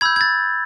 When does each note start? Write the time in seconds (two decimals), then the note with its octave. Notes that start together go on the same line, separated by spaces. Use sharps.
0.01 B5 E6 G6 G#6
0.16 G#6
0.21 A6